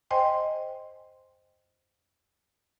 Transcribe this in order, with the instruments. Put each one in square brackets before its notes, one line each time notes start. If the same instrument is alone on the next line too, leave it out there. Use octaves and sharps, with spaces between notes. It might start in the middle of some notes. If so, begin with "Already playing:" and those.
[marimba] C5 D#5 G5 G#5 C6